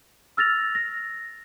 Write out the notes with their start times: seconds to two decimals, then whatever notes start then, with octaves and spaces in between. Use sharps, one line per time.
0.37 E6 F6 A6 A#6 F7
0.75 A#6